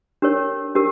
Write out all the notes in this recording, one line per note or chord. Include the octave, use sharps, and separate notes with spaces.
D4 G4 A#4 C#5
D4 G4 A#4